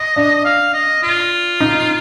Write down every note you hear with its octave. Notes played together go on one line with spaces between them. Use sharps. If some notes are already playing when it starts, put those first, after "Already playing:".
Already playing: D#5
D4
F5
D#5
F4
D#4